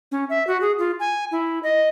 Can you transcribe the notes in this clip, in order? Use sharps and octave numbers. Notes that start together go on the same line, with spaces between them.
C#4
E5
F#4
G#4
F4
G#5
E4
D#5